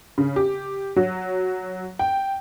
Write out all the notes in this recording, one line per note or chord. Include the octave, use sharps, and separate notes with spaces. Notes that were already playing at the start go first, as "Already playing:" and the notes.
C#3
G4
F#3
G5